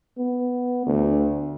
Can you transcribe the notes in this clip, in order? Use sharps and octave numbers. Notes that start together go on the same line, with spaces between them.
B3
D2